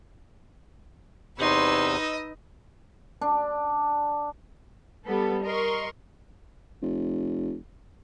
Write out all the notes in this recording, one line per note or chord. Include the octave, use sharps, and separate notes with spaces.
E2 C3 D#4 B4 C#5 C6 E6
D#5
D4
G3 B3 A4
A#4 D#5 C6 C#6
F1